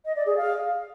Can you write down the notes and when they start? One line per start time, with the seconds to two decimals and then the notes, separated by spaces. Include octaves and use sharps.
0.05 D#5
0.15 D5
0.26 G#4
0.36 F5